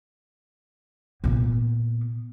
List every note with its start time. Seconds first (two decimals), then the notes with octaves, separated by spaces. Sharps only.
1.24 A#2 B3